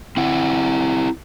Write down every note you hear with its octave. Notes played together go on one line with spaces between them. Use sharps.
C4 E4 F#5